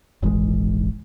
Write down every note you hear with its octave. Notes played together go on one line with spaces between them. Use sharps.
D#1 G#1 E3 G#3